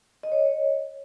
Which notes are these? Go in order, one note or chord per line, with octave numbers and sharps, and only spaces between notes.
D#5
C#5